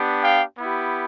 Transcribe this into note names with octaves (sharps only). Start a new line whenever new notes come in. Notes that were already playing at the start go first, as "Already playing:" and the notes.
Already playing: B3 D4 G4
F5 G5
B3 E4 G4